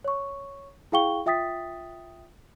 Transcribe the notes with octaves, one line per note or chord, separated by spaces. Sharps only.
C#5 C#6
E4 G#4 F5 G5 C#6 G7
F4 E5 G5 D#6 A6 B6